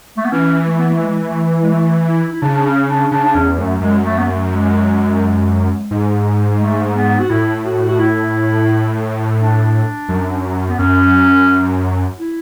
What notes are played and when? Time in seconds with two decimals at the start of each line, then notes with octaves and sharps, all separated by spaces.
0.17 A3
0.25 B3
0.32 E3 C#4
0.67 A3
0.78 B3
0.90 A3
1.02 G#3
1.25 A3
1.62 G#3
1.72 A3
2.06 E4
2.32 E4
2.42 C#3 D4
2.56 D4
2.65 C#4
2.88 D4
3.11 C#3 D4
3.24 D4
3.34 E2 C#4
3.58 F#2 A3
3.81 F#2 G#3
4.05 A3
4.18 B3
4.27 A3
4.51 G#3
5.91 G#2
6.60 A3
6.95 B3
7.20 F#4
7.29 A2 E4
7.64 F#4
7.88 F#4
7.99 E4
9.39 D4
10.09 F#2
10.70 B3
10.79 F#2 C#4
12.18 E4